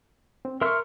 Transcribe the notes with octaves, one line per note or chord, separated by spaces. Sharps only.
C4
A#4 E5 C6 C#6 F6